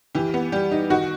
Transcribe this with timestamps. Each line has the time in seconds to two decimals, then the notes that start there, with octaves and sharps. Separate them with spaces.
0.15 E3 G4
0.34 B3
0.52 G3 G4
0.71 D#4
0.90 D#3 F#4